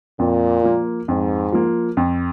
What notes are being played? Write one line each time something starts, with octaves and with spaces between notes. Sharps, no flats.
F2 A#2
F3 A#3
F2 G#2
F3 A#3
F2